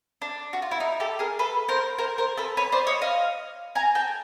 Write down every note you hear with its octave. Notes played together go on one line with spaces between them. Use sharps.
D4
F#4
F4
E4
D#4
G4 A4
G#4 A#4
A4 B4
A#4 C5
A#4 C5
A#4 C5
A4 B4
B4 C#5
C5 D5
C#5 D#5
D#5 F5
G#5 A#5
G5 A5